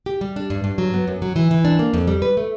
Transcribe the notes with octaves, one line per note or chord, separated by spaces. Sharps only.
G4
G3
D4
G2
G2
F#3
B3
F#2
F#3
E3
E3
D4
A#3
F2
G3
B4
A3